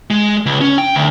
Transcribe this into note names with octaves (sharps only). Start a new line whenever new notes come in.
G#3
C#2
C#4
G5
D2